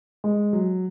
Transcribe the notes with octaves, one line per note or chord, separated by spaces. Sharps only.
G#3
F#3